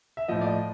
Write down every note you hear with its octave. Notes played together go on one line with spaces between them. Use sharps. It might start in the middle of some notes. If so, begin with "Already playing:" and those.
E5
A2 F3 D#5
D5
D#5